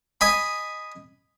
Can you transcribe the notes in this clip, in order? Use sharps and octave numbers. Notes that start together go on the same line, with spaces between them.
D#5 G#5 B5